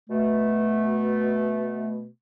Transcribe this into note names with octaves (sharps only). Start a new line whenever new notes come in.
B2 A3